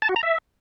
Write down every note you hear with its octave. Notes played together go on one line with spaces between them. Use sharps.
A5
F#4
A#5
E5